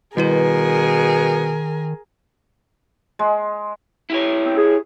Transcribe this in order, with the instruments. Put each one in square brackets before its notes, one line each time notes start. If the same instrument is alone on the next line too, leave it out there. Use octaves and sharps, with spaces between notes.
[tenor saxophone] B2 [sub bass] D#3 [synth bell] G3 E4 B4 [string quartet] G#4 A#4
[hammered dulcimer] G#3
[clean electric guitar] E4 G4 C#5
[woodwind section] C4
G#4